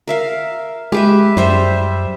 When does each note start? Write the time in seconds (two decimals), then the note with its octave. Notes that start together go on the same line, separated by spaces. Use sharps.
0.07 A#4 E5 F5
0.92 G#3 G4 B4 E5
1.37 F#2 G3 C5 E5